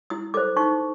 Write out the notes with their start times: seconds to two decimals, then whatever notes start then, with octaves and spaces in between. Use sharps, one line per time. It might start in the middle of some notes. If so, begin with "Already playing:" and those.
0.10 E4 D#6
0.34 A4 C5 D6
0.56 D#4 C#6